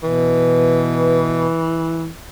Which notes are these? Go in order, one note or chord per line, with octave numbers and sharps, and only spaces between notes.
B2 E3